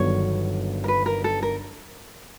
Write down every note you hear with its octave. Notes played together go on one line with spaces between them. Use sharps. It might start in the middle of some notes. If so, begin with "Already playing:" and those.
Already playing: G1 G2 D#3 F#3 B3 C#5
A#4
B4
A#4
A4
A#4